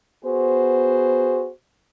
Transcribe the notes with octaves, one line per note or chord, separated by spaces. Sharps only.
B3 F#4 G#4 C5